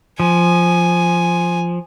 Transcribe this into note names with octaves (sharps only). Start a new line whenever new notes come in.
F3 G#5